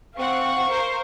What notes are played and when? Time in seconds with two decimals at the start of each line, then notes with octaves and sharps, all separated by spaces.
0.18 C4 F5 F#5 C#6
0.70 A#4 C5